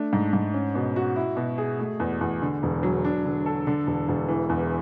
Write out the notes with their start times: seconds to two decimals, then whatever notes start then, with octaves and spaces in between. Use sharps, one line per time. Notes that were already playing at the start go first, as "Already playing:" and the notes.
Already playing: A3 D4
0.13 G#2
0.33 G#2
0.54 C#4
0.75 B2
0.96 F#4
1.16 E4
1.37 B2
1.58 G#4
1.79 A3
2.00 E2
2.21 E2
2.42 D3
2.63 E1
2.83 F#3
3.05 D4
3.25 D3
3.46 A4
3.67 D3
3.87 E1
4.08 E1
4.28 E3
4.49 E2